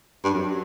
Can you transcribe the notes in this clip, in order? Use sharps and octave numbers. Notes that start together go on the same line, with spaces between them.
G2 F#3
F#2